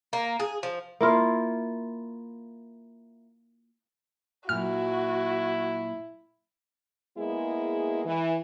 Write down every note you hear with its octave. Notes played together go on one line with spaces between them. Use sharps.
A#3
G#4
F3
A#3 E4 F4
A#2 F#3 E4 F#4 F6
G#3 A#3 B3 E4 G#4
E3